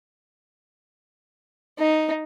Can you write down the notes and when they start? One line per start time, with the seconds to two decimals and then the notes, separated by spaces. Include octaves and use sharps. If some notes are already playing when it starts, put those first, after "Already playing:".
1.79 D#4